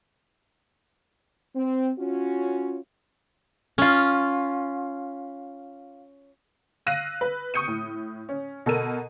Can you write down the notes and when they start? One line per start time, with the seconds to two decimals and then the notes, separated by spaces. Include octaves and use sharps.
1.55 C4
1.99 C#4 F4 F#4
3.78 C#4 F4
6.87 F5 E6 F#6 A#6 D#7
7.21 B4
7.54 C#6 D#6 G6 C#7 D#7
7.68 A2
8.29 C#4
8.66 B2 A4 A#4 D#7